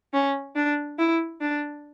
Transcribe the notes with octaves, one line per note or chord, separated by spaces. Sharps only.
C#4
D4
E4
D4